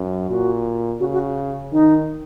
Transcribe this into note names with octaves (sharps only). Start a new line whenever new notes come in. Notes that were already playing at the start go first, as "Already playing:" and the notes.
Already playing: F#2
A#2 F#4
C#3 F#4
F#4
D#3 D#4